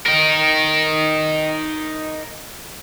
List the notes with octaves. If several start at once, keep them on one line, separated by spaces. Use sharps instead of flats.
D#4 A#4